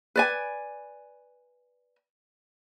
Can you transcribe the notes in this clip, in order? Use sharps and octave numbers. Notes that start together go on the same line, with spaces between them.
B4 D5 G#5